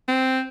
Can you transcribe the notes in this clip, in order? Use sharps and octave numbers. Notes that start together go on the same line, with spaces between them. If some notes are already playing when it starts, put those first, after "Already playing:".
C4